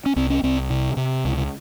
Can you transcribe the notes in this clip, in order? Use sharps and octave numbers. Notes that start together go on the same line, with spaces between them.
C#4
C2 C4
C#4
C2 C4
C3
C3
C#2